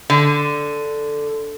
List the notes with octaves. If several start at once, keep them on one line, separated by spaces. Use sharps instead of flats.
D3